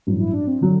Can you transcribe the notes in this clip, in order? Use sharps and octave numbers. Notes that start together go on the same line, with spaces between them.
A1 G2 F#3
E4
D4
C4
D3 F#3